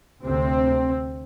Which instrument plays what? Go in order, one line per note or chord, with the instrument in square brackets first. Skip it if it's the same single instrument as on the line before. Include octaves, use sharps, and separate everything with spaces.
[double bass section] D2 C3 C4